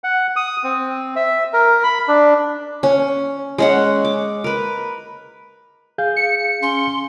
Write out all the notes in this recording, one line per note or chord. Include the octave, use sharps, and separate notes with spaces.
F#5
D#6
C4
E5
A#4
B5
D4
C#4
G#3 C#4 F#5
D6
A#4 B4
G#4 F5 G6
C#7
C#4 C6